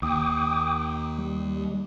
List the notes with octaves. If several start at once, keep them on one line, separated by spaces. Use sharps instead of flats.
D#2 G5 D6 D#6
G3